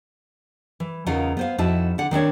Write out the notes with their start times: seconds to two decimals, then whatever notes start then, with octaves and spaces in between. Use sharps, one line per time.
0.80 E3
1.06 E2 C#3 D#4 F4 A#4 F#5
1.37 B3 C5 F5
1.58 F2 D#4 E4 F#4 E5 A5
1.98 D3 F#5
2.11 D#3 C4 D4 C#5